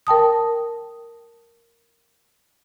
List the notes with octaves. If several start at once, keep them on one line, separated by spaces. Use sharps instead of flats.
A#4 G5 A5 D#6